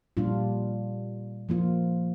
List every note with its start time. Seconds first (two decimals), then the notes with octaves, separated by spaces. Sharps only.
0.17 A#2 G3 D4 F4
1.49 F3 A#3 F4